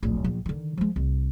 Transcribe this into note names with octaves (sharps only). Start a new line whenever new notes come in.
D1 A#1
A#1
D3 D#3
F3 G#3
C2